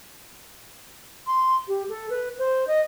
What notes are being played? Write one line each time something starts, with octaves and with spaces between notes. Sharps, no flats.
C6
G4
A4
B4
C5
D#5